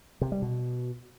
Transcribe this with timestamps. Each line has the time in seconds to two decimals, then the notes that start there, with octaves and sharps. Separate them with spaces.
0.21 C3
0.32 G3
0.42 B2